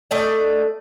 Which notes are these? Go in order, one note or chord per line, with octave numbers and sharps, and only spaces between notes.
A3 D5 D#5